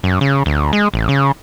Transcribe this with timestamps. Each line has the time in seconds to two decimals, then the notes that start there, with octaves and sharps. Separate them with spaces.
0.03 F#2
0.21 C#3
0.46 D2
0.73 G#3
0.94 A1
1.09 C#3